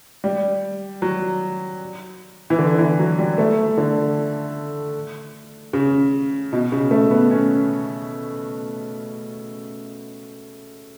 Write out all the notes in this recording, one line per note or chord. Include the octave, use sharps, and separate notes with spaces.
G3
F#3
E3
D3
E3
F#3
G3
A3
D3
C#3
B2
C#3
A3
B3
C#4